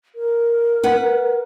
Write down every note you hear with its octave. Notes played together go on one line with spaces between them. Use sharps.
A#4
B4 F#5